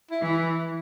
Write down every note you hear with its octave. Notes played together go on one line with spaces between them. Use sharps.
E4
E3
E4